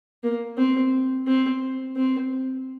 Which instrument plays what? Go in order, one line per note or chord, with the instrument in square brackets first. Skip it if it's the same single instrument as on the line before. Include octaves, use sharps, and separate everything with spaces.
[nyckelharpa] A#3
C4
C4
C4